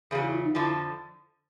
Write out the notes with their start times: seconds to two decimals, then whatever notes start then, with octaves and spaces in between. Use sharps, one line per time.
0.11 E2 C#3 F#3 G#4
0.22 E4
0.33 F4
0.43 D#4
0.55 F2 D3 F3 E4